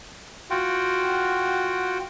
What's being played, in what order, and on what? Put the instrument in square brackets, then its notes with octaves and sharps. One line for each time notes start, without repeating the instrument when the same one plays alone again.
[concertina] F4 F#4 F#5 G5